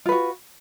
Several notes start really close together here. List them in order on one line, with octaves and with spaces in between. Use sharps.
F4 B4 F#4